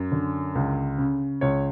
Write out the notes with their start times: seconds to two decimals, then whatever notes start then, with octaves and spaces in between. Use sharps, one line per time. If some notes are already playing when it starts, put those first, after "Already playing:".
Already playing: F#2
0.12 D3
0.55 C#2
0.98 C#3
1.41 C#2 C#5